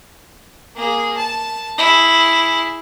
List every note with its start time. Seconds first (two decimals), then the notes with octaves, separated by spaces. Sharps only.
0.75 A#3 G#4
1.17 A5
1.78 E4 G#4